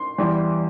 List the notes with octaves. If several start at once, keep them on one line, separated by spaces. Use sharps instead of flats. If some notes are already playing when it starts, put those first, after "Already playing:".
Already playing: C6
E2 E3 G3